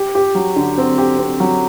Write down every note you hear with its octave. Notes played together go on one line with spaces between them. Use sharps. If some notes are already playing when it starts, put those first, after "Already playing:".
Already playing: G4
G4
F#3
D3
C4
G4
C4
F#3